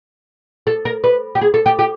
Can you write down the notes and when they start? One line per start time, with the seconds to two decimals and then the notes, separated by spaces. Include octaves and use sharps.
0.67 A4
0.85 A#4
1.04 B4
1.35 G4
1.41 G#4
1.54 A4
1.66 G4
1.79 G4